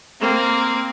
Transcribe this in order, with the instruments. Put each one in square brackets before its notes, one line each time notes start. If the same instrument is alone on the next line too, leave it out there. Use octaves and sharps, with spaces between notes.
[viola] A#3 [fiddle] C4